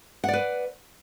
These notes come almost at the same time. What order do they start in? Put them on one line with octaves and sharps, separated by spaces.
F#5 D5 B4